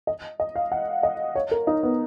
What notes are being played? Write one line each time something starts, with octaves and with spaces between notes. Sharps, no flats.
D#5
D#5
F5
F#5
D#5
C#5
A#4
D#4
B3